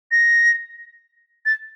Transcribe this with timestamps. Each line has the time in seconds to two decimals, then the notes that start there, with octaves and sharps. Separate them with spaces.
0.12 A#6
1.46 A6